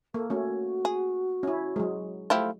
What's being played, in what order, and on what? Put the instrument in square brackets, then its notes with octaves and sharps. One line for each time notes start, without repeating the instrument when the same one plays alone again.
[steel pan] A#3 [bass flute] A4
[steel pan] A3 C#4 [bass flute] F#4
[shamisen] G#4
[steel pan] C#4 E4
F#3 G#3
[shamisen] F3 E4 G4 [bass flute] A3